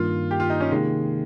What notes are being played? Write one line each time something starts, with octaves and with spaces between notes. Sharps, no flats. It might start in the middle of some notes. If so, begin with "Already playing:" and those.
Already playing: G2 D#3 A#3 F4
G4
F4
D#4
C#4
C3 D#3 G#3 A#3